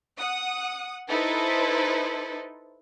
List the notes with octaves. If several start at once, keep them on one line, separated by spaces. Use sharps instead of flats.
F#5 D#6
D#4 E4 A4 B4 C5